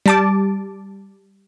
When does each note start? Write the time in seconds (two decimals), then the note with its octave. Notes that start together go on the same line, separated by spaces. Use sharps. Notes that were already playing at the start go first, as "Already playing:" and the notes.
0.06 G3 A5 D6